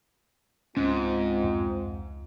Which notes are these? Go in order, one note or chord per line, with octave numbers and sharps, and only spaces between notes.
C#2 G#2 C4 C#4 F4
F2